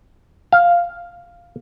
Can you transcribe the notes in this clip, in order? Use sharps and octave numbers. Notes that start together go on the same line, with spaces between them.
F5